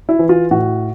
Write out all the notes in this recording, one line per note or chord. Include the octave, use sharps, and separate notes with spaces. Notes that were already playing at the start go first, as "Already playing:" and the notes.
E4
E3
F4
A2 F#4